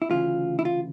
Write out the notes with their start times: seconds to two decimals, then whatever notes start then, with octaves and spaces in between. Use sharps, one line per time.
0.02 E4
0.10 D2 C#3 E3 F4
0.59 E4
0.65 F4